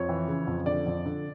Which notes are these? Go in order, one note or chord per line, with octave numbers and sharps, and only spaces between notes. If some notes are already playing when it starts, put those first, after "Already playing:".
Already playing: F2 C#5
E3
C#3
F2
D3 D5
F2
D3